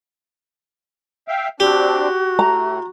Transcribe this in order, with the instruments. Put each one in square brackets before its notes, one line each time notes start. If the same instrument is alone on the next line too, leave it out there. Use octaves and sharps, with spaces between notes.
[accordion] E5 F5 G5
[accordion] C4 D4 [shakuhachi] F#4 [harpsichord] G4
[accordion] A2 A3 [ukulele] A#5